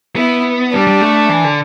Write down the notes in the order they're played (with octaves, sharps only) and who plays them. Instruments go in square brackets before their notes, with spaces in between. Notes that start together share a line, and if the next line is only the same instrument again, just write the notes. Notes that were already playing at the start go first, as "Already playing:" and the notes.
[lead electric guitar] B3 [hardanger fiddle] E4
[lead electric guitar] G3 [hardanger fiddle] D4
[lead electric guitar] G3
A3
E3
D3